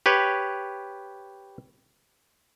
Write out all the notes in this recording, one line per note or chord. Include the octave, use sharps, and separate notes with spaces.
G4 B4 C#5